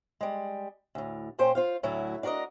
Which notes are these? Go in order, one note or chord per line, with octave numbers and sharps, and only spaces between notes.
G3 G#3
D2 A2
A#2 A#3 C#4 C5 G5
F4 C5 F5
D2 A2 F#3 A3 E4
D4 F#4 A#4 D5 D#5